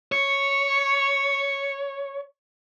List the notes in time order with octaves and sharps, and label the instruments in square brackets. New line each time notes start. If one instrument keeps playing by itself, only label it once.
[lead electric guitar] C#5 [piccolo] C#7